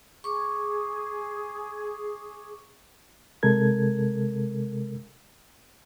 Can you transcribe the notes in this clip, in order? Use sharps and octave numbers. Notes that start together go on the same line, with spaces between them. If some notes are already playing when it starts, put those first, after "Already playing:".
G#4 C#6 D6
C3 G#3 A4 A#4 G#6